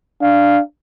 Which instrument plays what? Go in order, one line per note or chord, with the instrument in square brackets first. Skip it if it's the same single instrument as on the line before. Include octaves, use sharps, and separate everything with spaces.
[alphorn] D4 [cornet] F5